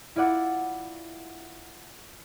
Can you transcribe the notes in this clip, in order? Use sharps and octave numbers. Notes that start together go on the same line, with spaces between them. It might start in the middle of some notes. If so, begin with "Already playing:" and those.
E4 F4 D5 F#5 D6